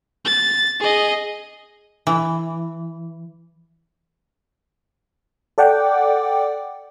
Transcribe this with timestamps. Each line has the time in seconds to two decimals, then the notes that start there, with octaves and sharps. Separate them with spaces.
0.25 A6
0.80 G#4 D#5
2.07 E3
5.58 A4 D5 F#5 G5 D6